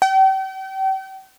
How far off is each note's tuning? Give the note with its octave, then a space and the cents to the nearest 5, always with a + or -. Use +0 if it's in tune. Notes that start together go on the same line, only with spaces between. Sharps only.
G5 -35